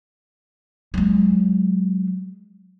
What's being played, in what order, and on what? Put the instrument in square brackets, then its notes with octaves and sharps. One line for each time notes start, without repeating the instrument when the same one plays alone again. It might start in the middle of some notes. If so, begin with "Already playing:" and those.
[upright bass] F#3 G#3